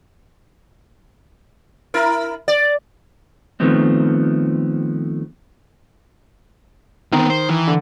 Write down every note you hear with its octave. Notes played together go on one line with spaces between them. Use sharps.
E4 A#4
D5
D#3 F3 A3 B3 C4
D#3 B3 C4
C5
E3
D3